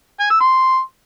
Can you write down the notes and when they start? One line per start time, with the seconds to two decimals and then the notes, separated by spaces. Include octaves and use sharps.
0.20 G#5
0.30 E6
0.40 C6